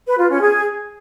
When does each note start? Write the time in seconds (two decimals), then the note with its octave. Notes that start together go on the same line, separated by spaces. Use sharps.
0.07 B4
0.18 F4
0.30 C#4
0.41 G#4